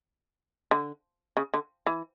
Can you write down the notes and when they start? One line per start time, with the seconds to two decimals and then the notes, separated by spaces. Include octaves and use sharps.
0.71 D3
1.37 C#3
1.54 D3
1.86 E3